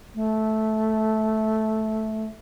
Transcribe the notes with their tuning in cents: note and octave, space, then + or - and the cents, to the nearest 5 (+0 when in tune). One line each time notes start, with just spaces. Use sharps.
A3 -10